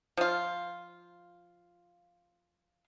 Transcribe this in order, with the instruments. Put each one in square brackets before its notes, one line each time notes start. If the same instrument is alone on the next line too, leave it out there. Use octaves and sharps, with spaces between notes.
[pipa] F3 F4